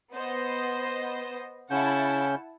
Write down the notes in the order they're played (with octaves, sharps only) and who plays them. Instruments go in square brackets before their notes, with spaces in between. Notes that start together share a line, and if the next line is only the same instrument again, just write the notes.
[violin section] B3 C5 D#5
[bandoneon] C#3 C#4 G6 [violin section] E4 F#5 A5